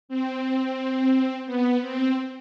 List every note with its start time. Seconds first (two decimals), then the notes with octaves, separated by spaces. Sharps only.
0.09 C4
1.46 B3
1.81 C4